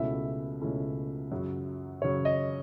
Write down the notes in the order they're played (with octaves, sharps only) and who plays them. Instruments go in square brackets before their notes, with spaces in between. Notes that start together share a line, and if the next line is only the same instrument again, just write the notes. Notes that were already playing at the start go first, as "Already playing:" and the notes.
Already playing: [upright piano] C#2 B2 A3 C#4 E4 [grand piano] E5
[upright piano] C#2 B2 A3 C#4 E4
F#2 C#3 F#3
[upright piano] F#2 C#3 F#3 [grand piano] C#5
[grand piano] D#5